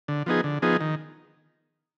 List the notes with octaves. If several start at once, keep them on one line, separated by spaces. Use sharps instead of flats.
D3
F3 B3 D#4 G#4
D3
F3 B3 D#4 G#4
D#3